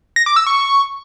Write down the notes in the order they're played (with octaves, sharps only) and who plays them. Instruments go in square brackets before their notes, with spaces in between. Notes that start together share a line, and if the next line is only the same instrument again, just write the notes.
[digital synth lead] A#6
D6
E6
C#6